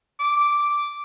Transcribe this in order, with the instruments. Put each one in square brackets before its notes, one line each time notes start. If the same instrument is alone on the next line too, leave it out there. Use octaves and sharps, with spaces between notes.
[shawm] D6